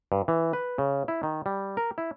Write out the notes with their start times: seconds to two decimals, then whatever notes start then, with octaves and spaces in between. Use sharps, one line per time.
0.12 G2
0.28 E3
0.53 B4
0.78 C#3
1.08 E4
1.23 D#3
1.46 G3
1.77 A#4
1.98 E4